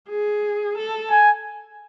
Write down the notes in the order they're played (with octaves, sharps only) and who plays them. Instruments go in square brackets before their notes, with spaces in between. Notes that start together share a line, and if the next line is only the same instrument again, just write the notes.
[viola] G#4
A4
[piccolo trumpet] G#5